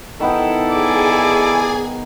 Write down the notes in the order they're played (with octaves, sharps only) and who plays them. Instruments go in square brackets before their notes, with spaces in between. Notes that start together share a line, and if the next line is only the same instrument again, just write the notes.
[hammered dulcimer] D#3 B3 G5 [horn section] E4 A4
[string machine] G#4 G#5 [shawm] D5